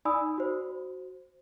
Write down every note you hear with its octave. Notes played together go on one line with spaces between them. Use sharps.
D#4 D5 G#5 B5 D#6 E6
F#4 C5